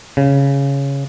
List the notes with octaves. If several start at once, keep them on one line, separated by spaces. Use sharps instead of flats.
C#3